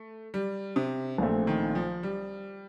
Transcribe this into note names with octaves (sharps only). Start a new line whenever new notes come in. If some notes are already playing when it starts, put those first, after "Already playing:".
Already playing: A3
G3
C3
A#1 A#2 A3 C4
D#3
F3
G3